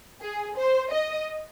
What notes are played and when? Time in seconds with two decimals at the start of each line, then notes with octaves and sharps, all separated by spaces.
0.21 G#4
0.56 C5
0.91 D#5